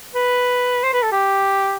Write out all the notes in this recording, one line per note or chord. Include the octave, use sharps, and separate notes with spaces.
B4
C5
B4
A4
G4